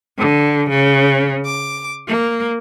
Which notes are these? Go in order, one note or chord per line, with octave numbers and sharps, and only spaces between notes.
D3
C#3
D6
A#3